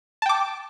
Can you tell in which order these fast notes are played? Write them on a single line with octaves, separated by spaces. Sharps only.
A5 G5 D6